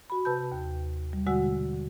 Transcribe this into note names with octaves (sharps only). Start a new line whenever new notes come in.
F#4 B5
C3 B4 A5 G6
D#2
G3
B2 D3 G#3 F#4 F#5 E6